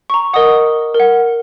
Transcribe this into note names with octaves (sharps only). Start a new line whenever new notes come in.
C#6
A#5
A#4 D#5 F#5 D#6
A#4
F#5